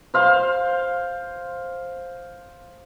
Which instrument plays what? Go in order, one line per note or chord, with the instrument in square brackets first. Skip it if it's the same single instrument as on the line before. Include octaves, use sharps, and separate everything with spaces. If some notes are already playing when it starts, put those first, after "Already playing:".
[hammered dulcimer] C5 F5 C6